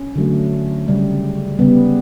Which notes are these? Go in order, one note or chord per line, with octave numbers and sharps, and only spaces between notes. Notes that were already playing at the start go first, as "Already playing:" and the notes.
Already playing: C#4
D3 F#3 A3
C#3 G3
C#3 G3 B3